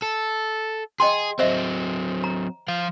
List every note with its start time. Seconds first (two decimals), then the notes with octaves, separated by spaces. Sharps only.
0.02 A4
1.00 G#4 D#5 G5 C6
1.39 F#3 C4 C5 D#5 E5
2.24 A#5
2.68 F3 F5